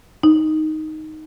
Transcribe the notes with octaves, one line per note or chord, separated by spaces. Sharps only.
D#4